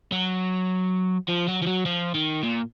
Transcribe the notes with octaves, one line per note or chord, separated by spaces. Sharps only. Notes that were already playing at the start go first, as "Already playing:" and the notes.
F#3
F3
F#3
F3
F#3
F3
D#3
A#2